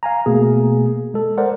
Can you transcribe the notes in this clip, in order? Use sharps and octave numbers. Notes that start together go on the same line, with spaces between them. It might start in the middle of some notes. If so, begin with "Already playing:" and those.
F5 G#5 A#5
B2 A3 A#3 G#4
G#3 A4
A#4 C5 D5 F#5